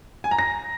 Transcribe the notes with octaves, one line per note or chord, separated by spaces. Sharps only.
G#5
A#5
A#6